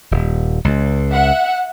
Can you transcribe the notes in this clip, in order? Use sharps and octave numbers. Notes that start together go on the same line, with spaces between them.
D#1
C#2
E5 F#5